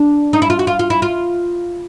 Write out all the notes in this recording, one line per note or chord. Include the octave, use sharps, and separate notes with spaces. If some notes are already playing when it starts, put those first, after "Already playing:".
Already playing: D4
D#4
E4
F4
F#4
F4
F4
E4
F4